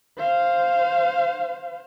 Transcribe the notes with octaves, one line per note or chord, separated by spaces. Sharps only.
C5 F5